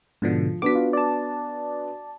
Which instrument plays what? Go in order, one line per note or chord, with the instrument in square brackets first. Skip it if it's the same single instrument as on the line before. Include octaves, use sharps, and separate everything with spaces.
[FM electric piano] G#2 B2 D3 [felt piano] F3
[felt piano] B3 D4 F#4 [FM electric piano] D6 B6
[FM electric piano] F4
D5 A5